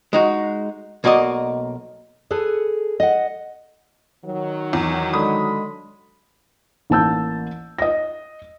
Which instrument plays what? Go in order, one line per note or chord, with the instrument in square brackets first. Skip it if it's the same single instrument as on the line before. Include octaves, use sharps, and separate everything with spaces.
[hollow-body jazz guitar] G#3 D#4 F#4
B1 A#3 F#4 D5 D#5
[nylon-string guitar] G#4 A4 B4
D#5 F#5
[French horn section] D#3 F#3
[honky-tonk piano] E2
[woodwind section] D3 G#3 [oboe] B5 [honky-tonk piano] D#6
[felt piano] A1 A#3 A5 E6 G6
D#5 A#6